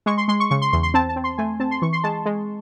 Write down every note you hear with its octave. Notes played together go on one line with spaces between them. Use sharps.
G#3 C#6
C6
G#3 C6
C#6
C#3 C#6
C6
E2 C6
C6
C4 A5
A5
C4
C6
A3 G#5
C4 A5
C6
E3 C#6
C6
G#3 A5
G#3